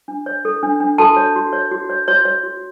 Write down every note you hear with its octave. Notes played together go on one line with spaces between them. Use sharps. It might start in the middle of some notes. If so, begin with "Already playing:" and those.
D4
C#5
A4
D4
D4
F#4 A4 A5
C#5
F#4
C#5
F#4
C#5
F#4 C#5
C#5
F#4